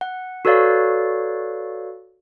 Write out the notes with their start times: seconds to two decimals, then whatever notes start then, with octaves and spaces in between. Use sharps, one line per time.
0.01 F#5
0.45 F#4 A4 B4 C#5 D5 F5